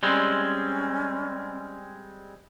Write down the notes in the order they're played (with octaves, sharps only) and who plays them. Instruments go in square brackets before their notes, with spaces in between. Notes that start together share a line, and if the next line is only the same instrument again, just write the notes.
[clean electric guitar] G3 G#3 C4 [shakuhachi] C#4